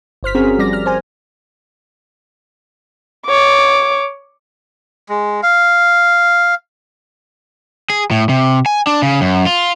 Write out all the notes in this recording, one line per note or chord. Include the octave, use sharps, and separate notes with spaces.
G1 C5 F6 B6
C4 C#4 F#4 G#4 A#4
F3 G3 D5 A#6
F6
C5 G#5
C#5 D6
G#3
F5
G#4
A2
C3
G#5
D4
C#3
F#2
F4